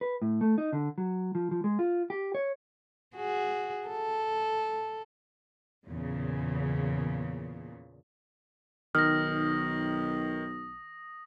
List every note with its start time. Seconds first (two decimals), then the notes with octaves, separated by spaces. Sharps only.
0.01 B4
0.22 A2
0.41 A3
0.58 D#4
0.73 D3
0.98 F#3
1.35 F3
1.51 F3
1.64 G#3
1.79 F4
2.10 G4
2.35 C#5
3.16 F#4 G#4
3.88 A4
5.88 E2 A#2 C#3
8.95 B1 D#3 D#6 F6 A#6